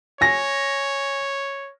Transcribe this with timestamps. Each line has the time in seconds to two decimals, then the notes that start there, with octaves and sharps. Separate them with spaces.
0.21 C#5 G#5 A#6